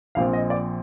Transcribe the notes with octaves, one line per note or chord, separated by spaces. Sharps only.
A#1 A#2 F3 C4 F5
D#5
D5